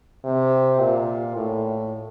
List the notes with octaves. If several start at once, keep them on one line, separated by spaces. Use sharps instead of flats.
C3
A#2
A2